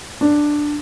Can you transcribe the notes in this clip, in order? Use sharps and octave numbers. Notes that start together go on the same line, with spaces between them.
D4